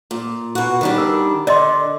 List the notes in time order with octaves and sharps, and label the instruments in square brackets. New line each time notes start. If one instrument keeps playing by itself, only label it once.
[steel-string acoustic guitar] A#2
B2 F#4
D#3 G3 D4
[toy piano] A#4
[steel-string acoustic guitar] D3 [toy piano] D5 D#5 C6